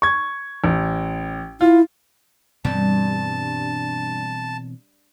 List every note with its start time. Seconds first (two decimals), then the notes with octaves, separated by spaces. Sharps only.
0.02 C#6 G#6
0.64 A1
1.61 E4 F4
2.65 G2 B2 E3 C4 A5